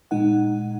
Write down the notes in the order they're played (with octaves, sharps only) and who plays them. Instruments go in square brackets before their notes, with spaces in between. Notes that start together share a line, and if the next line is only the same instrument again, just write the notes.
[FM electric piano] A#2 G#3 D#4 F#5